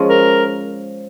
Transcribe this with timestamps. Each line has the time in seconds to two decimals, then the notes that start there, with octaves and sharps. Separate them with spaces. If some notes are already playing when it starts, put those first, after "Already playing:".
Already playing: F3 G#3 C#4
0.09 A#4